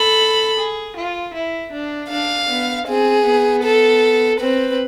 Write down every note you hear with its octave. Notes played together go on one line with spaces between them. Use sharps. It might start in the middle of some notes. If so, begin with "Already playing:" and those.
Already playing: A4 B5
G#4
F4
E4
D4
D4 F5
B3
C4 G#4
B3
A4
C4 B4